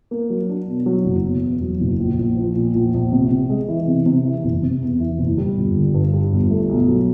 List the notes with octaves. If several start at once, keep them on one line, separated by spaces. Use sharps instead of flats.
A#3
F#3
D4
B2
F#3
F#1
B2
E2
F#3
F#1
A#1
A#1
F3
A#2
A#1
A#1
C3
C3
G#3
E3
C3
C3
E3
F#1
C3
E2
E3
F#1
G3
G1
D3
G2
G3
G1
A3
B1
F#3